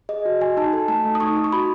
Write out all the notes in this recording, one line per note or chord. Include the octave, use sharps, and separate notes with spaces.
G#4 D#5
F#4
F#4 G#5
D#4 A5
A4
A3 A5
A3
D#6
D#4 C#6
D#4
C#6
F#4 B5